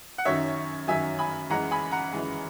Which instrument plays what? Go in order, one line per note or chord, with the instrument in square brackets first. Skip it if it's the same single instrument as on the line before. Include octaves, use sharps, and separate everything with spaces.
[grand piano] F#5
F#2 D#3 F#3 C#5 E5
F#2 D#3 F#3 E5 G#5
G#5 B5
F#2 E3 G#3 F#5 A#5
G#5 B5
F#5 A#5
F#2 E3 G#3